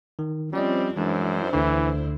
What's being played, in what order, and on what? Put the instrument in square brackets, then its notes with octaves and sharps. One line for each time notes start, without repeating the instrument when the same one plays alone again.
[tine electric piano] D#3
[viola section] F3 C4 [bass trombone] G3 [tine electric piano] C#4 D5 D#5
[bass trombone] F#2 [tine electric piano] E3 G#3 [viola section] D4 E4 C5
[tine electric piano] D2 D3 [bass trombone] E3